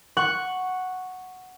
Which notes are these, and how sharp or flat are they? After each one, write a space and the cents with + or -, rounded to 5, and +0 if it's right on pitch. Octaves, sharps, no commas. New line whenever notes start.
F#5 +0 C#6 +0